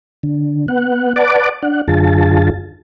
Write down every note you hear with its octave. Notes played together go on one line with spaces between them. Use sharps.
D3
B3 F#5
B4 D5 F#5 A5 D6
D4 F#5
F#2 D3 F4 G#4 A5